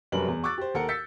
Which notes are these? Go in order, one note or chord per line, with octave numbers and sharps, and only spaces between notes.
F1 F#2 G3 A#4 B4 F#7
E2
C#6 D6 E6 F#6 A6
G4 C5
D#2 A4 A#4 F#5 C#7
E6 G6 A6 B6 C#7